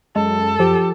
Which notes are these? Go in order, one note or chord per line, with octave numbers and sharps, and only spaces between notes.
F#2 G#3 A4
F3 G4